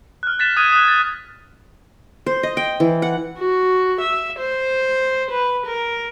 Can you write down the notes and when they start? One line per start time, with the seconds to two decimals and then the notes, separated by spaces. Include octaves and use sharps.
0.23 F6 F#6
0.39 F#6 A6 B6 E7
0.57 D#6 F#6 G#6 D#7
0.72 D#6 F#6
0.88 A6
2.26 C5
2.43 D#5
2.57 G5
2.80 E3
3.02 F#5
3.38 F#4
4.01 E5
4.39 C5
5.31 B4
5.66 A#4